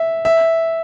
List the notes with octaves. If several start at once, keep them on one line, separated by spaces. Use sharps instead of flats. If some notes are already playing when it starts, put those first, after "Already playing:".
Already playing: E5
E5